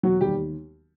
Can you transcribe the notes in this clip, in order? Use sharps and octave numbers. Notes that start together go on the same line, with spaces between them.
E1 F#3 F#4
D#2 G3 G4